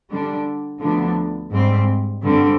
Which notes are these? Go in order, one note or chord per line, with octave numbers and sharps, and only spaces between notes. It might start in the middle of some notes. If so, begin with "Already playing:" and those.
D3 G3 D4
D2 D3 F3 B3 D4
G#2 G3 C4
G2 D3 G3 C4